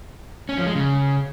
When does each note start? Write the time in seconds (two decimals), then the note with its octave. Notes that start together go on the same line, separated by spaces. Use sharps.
0.49 C#4
0.58 F3
0.67 G#3
0.75 C#3